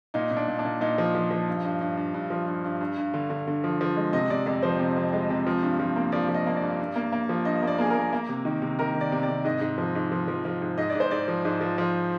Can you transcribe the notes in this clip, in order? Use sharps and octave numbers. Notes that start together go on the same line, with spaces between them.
A#2 D#4
A#2
D4
A#2
D4
A#2
A#2 D#4
F3
F3
F3
G2
G2
G2
G2
G2
F3
G2
G2
G2
G2
D3
D3
D3
F3
F3
G#3
C3 D#5
C3 D5
F2 D5
F3 C5
C3
F2
G#3
C3
F3
G2
F3
A#3
F3 D5
F3
D#5
A#3
D5
G2
G2
A#3
A#3
F3
G2 D#5
A#3 D5
A#3 G#4
A#3 A#4
A#3
C3
D#3
C3
D#3 A#4
D#3
D5
C3
D5
C3
G#2 D#5
G#2
F3
G#2
F3
F3
F3
G#2
G#2 D#5
D5
G#2
C5
G#2 D5
F3
G#2
F3
F3